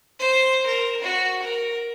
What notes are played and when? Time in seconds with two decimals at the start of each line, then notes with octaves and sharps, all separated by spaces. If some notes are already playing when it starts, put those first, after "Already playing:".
0.19 C5
0.66 A#4
1.02 F#4
1.42 A#4